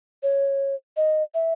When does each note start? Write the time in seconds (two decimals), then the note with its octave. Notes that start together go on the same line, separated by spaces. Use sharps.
0.23 C#5
0.97 D#5
1.34 E5